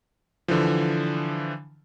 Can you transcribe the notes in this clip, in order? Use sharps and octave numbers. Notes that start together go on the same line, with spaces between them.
D3 E3 F3